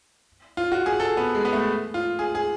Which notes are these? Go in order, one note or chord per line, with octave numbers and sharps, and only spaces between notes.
F4
F#4
G#4
A4
B3
G#3
B3
A3
F4
G#4
G#4